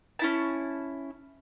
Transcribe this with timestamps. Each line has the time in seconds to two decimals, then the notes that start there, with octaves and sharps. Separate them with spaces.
0.19 C#4 E4 A5